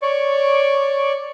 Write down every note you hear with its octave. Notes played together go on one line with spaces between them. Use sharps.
C#5 D5 C#6 D6